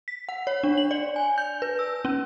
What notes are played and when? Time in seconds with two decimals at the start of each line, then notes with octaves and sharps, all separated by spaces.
0.08 B6
0.29 F#5
0.47 C#5
0.63 D4
0.77 F#7
0.91 D5
1.16 G#5
1.38 G6
1.62 B4
1.79 E6
2.05 C#4